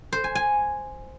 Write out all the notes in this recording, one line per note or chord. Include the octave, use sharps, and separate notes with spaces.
C5
G#5
G#5